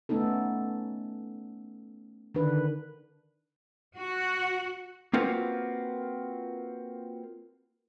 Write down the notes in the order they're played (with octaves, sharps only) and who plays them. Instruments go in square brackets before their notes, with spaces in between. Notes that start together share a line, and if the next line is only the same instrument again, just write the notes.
[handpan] A3 B3 C#4 D#4 A4
D3 D#3 D4 B4
[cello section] F#4
[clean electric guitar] A#3 C4 F4 F#4 A#4 B4